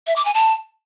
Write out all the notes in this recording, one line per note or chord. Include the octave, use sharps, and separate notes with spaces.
E5
D6
G#5
A5